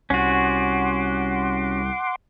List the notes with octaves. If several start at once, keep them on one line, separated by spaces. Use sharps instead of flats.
C2 C#4 F#4 F#5 C6 D6